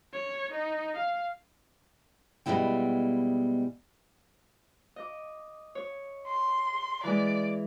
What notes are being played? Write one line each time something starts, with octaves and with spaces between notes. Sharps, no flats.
C#5
D#4
F5
B2 E3 G3 G#3 E4 G5
D#5 D6
C#5
C6
E3 G#3 D5